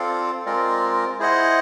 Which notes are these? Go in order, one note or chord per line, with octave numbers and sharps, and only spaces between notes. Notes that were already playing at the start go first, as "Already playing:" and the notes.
Already playing: C4 F4 A4 D5 F5
G#3 C4 F4 A#4 D5
E4 G#4 C5 D#5 F#5